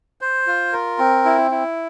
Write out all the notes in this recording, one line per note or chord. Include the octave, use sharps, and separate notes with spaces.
C5
F4
A#4
C4
E4
E4